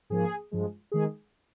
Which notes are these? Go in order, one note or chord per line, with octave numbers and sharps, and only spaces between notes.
G#2 F3 A#3 G#4
G2 F3 G#3
D#3 G#3 G#4